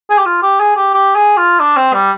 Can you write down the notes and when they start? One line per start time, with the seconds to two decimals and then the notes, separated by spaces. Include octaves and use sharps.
0.10 G#4
0.18 G4
0.26 F4
0.43 G4
0.60 G#4
0.76 G4
0.94 G4
1.16 G#4
1.37 F4
1.60 D4
1.76 C4
1.94 G3